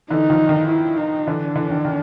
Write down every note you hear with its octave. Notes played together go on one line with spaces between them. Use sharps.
D3 E3 D#4
D#3 F3
D#3
E4
D#4
D3 E3 D4
D3 E3
D#3
D#3